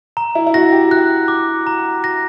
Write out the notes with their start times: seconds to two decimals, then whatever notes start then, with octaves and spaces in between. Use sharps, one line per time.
0.17 A#5
0.35 E4
0.47 E4
0.54 F#4 A#6
0.72 G4
0.91 F#6
1.28 D6
1.67 A#5
2.04 A#6